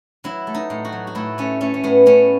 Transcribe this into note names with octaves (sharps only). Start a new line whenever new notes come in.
F#3 E4
A3
D#4
A2
F#4
F#3
F#4
A2 E4
A3 C#4
A3 C#4
C#4
A2 B3
A2 C#4